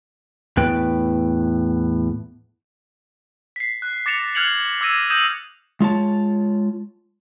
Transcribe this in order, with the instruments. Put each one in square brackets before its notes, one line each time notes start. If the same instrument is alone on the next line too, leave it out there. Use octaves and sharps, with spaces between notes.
[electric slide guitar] E2 A2 B3 B4 G5
[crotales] B6 C7
F#6
D6 A6 A#6 C#7 E7 F7
F6 F#6 G#6 C#7 F7 F#7
D6 E6 G#6 A#6 D#7
D#6 G6 A#6 D#7 E7 F#7
[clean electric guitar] G#3 F4 C#5 A5